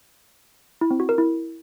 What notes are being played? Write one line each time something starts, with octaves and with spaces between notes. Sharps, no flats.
E4
C4
F#4
A#4
E4